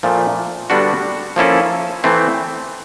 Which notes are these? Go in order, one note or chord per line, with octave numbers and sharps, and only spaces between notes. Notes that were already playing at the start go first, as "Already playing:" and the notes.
A#2 F3 A3
D3 G3 B3 D4 F#4
F3 A#3 C#4 E4 A4
E3 A3 C4